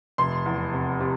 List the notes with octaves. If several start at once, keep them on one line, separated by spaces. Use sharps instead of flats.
F1 C6
E2
C3
C3